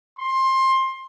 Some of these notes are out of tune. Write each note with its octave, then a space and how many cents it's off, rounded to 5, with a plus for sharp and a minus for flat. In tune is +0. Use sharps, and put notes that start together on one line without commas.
C6 +20